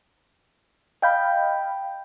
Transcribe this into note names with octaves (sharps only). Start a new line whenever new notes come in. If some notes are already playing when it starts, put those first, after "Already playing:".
D#5 F5 G5 B5 G6